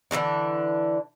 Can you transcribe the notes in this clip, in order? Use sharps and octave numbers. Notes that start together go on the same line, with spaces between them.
D3 E3 G#3 D4